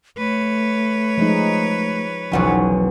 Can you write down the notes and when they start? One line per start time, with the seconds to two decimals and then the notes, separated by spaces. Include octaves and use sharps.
0.18 A3 B4 C#5
1.17 F3 G#3 D#4
2.32 E1 B1 F3 C#4 F#5